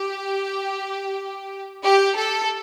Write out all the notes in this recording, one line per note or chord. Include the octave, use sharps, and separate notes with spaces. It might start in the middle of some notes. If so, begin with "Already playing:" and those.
Already playing: G4
G4
A4